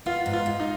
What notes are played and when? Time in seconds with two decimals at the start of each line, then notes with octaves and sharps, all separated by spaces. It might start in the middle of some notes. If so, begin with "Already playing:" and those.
0.06 B3 F4
0.26 G#2
0.33 F4
0.46 G#2
0.60 D#4